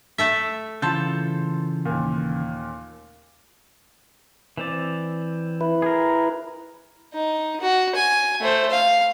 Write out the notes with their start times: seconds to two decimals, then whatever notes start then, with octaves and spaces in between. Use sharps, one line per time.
0.18 A3 A4 E5
0.82 C#3 E3 F4 A4 A5 C6 G6
1.85 D#2 A#2
4.57 E3 C4 D5
5.61 E4 B4
5.82 G#4 A#4
7.14 D#4
7.61 F#4
7.95 G#5
8.41 A3 C5
8.70 F5